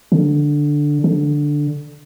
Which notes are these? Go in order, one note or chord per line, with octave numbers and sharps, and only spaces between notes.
D3
D3